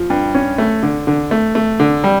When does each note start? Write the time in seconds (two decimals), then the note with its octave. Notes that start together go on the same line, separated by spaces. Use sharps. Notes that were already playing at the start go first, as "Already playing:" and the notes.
Already playing: F3
0.10 G2
0.34 C#4
0.58 A3
0.83 D3
1.07 D3
1.31 A3
1.55 A3
1.80 D3
2.04 G3